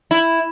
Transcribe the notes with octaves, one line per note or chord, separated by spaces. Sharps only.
E4